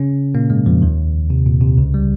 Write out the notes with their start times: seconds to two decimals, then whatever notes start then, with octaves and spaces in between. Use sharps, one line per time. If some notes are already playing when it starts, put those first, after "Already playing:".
Already playing: C#3 C#4
0.35 A#2 A#3
0.50 G#2 G#3
0.66 F2 F3
0.82 D#2 D#3
1.30 C3
1.46 A#2
1.61 C3
1.78 C#2 C#3
1.94 G3